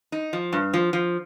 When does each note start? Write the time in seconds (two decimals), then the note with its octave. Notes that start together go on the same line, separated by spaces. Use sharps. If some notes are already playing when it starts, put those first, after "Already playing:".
0.12 D#4
0.33 F3
0.53 G2
0.74 F3
0.93 F3